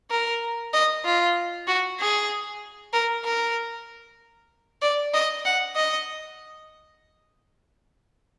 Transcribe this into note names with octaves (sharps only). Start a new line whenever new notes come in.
A#4
D#5
F4
F#4
G#4
A#4
A#4
D5
D#5
F#5
D#5